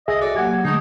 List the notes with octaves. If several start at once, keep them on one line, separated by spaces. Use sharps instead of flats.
C2 G#4 D#5 E5
F#4 A4 C#5 D5
F#3 A#3 G4 F#5 G#5
D3 G#3 A3 D#4 C#6 D#6